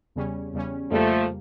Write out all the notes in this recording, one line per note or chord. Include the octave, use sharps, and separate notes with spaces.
E2 C#3 G3 C#4
E2 C#3 G3 C#4
F2 C#3 F3 G3 A3 A#3